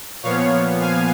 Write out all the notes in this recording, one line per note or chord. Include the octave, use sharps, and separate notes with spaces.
A#2 F3 B3 C#5 F5
F5 G#5